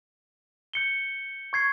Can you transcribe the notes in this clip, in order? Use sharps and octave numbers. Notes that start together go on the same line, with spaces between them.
G6 C#7 G7
C#6 G#6 C7